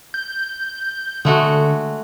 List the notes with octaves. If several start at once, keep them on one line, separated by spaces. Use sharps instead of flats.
G6
D3 G#3 A3 F#4